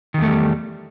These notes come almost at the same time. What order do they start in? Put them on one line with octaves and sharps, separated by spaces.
D#3 E2 A3 G3